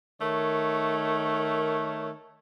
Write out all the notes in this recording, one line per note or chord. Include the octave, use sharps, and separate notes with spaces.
D#3 A3 A#4 C#5